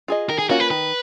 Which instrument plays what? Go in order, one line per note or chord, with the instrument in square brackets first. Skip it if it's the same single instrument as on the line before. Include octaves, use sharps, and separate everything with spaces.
[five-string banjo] F4 G#4 D#5
[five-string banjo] D#3 [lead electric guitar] A#4
[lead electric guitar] G#4
[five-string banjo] A#3 C#4 F4 [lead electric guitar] F#4
[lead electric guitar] B4
[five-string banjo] D#3 [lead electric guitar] B4